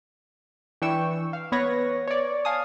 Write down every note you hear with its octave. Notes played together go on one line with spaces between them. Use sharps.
E3 D4 G5 C#6 E6
F5
B3 B4 C#5 A#6
C#5 D5
F5 G#5 A5 D#6